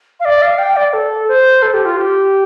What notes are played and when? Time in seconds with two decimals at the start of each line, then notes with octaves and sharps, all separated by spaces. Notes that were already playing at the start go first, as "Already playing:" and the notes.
0.20 F5
0.25 D5
0.42 F5
0.58 G5
0.76 D5
0.93 A4
1.28 C5
1.62 A4
1.74 G4
1.85 F4
1.97 G4